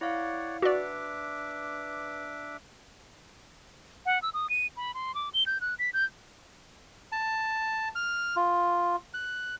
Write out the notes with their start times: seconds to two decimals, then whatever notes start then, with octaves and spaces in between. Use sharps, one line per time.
0.01 E4 C#5 D5 F5 F#5
0.62 D4 F#4 B4 D5 E5 D6
4.06 F#5
4.22 E6
4.34 D#6
4.50 D#7
4.77 B5
4.94 C6
5.15 D6
5.34 G7
5.46 G6
5.61 F#6
5.79 B6
5.93 G6
7.12 A5
7.95 F6
8.36 F4
9.14 F#6